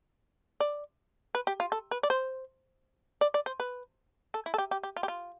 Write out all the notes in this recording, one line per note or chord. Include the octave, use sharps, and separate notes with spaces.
D5
B4
G4
F4
A4
B4
D5
C5
D5
D5
C5
B4
A4
E4
A4
G4
G4
G4
F4
G4
F4